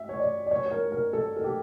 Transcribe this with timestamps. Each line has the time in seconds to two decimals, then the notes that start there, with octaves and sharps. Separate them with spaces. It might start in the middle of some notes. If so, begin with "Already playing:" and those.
Already playing: E5
0.09 C#5
0.19 D5
0.46 D5
0.51 C#5
0.66 C#5
0.71 A#4
0.92 A#4
1.13 A4
1.37 A4
1.44 G4